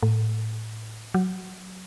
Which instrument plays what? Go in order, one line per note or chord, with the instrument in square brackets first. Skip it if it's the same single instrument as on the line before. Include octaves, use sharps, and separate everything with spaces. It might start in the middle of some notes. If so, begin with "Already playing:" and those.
[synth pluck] A2
F#3